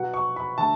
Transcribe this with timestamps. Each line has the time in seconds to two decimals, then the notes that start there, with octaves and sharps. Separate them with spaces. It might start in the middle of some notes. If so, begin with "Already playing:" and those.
Already playing: B2 F#3 B3 F#5
0.14 C#6
0.36 B5
0.58 D3 A3 A5